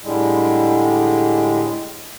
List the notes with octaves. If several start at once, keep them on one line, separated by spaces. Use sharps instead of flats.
A2 D3 G3 G#3